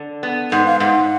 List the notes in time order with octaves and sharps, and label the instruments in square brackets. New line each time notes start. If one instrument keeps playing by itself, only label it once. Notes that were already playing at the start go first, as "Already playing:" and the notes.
Already playing: [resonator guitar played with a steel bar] D3
B3
[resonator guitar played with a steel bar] G#2 [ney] F#5
[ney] F5
[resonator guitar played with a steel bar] G#2 [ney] F#5